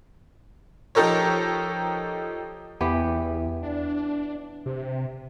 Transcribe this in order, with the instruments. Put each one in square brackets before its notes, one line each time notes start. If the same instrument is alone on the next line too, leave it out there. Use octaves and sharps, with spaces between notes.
[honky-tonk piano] F3 D#4 G4 A4 A#4 C#5
[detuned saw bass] E2 [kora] E3 B3 G4
[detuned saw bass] D4
C3